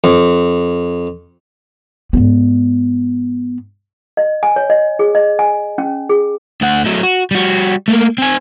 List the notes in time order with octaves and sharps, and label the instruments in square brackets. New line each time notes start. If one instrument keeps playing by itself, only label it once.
[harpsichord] F2
[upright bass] G#2 B3
[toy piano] D#5
G#5
C#5
D#5
G#4
D#5
G#5
C#4
G#4
[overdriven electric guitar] D2 F#5
F#3 A3
F#4
G3 F#4
A3 A#3
C4 G#5